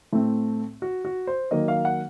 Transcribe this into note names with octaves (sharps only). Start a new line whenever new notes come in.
A2 A3 C4
F#4
F#4
C5
D#3 F#3 A#3 D#5
F5
F#5